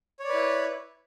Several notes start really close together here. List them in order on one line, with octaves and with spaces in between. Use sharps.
C#5 D5 B4 E4